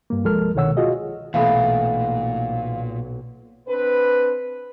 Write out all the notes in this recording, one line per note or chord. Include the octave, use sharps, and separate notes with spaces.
G2 A#3
C2 F3 G#3 A4 A#4 F6
C2 B2 D#3 C#5 F#5 E6
F4 F#4 G#4 D#5
B1 A#2 E3 A3 B3 F5 F#5 A6
C4 D4 B4